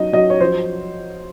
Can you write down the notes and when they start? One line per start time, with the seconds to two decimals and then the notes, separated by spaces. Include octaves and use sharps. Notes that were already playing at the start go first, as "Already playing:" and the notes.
Already playing: F#3 D#4 D#5
0.13 F#3 D#5
0.30 C#5
0.40 F3 C5